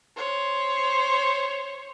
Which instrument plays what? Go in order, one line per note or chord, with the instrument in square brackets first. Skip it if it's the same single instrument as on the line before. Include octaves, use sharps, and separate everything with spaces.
[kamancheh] C5 C#5